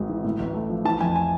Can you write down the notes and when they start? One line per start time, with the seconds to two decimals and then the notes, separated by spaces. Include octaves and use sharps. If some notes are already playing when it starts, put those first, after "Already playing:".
Already playing: G#1 G#2 G#3 B3
0.09 E3
0.24 A2
0.40 A1
0.54 A3
0.70 F3
0.85 E3 A5
1.01 F2 G#5
1.16 G#5